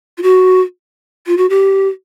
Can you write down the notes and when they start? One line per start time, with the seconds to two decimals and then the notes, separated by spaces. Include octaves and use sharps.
0.18 F4
0.23 F#4
1.27 F4
1.37 F#4
1.50 G4